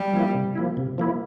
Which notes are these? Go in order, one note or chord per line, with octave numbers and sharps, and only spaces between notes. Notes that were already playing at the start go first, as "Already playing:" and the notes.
Already playing: G3
F3 A#3 E4
C3
F3 A#3 E4
C3
F3 A#3 E4